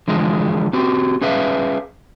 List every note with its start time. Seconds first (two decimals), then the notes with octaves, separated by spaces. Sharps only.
0.08 D3 E3 F3 G#3 G#4
0.73 C4 F#4 G4
1.21 C#4 G#4 B4 E5 F5